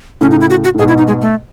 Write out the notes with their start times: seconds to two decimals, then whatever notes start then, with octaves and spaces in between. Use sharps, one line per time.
0.21 A2 C#3 C#4
0.31 D#4
0.41 E4
0.50 F#4
0.64 F#4
0.74 A2
0.78 G#2 B2 G#4
0.88 E4
0.98 D#4
1.07 G#3
1.22 A3